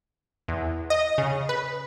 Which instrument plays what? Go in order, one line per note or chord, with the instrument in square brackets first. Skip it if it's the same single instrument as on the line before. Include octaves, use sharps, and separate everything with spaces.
[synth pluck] E2
D#5
C#3
B4